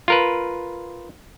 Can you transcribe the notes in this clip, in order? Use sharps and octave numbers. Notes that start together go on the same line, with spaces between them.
F4 A#4 B4